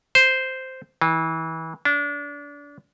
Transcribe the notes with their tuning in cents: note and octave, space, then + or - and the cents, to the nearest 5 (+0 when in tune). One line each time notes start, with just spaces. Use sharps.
C5 -5
E3 -30
D4 -30